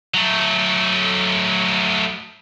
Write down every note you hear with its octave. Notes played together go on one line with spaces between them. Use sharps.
F#3 A3